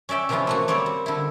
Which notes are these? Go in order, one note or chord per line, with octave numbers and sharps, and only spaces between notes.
C#4 D5 E5 G5
C3 E3 F3 B3 C#4 F4
A3 A#3 F#4
G3 A#3 C4 C#5 D5
C4
D3 E4